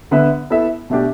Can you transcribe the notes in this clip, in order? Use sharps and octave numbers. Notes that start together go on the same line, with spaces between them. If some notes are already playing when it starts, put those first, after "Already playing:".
D3 B3 D4 B4 E5
B3 E4 A4 E5
B2 A3 D4 G4